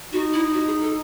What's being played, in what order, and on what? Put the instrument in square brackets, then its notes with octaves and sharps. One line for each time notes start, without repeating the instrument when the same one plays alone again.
[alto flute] D#4 [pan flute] F#4
[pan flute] E4
F#4
G#4
A4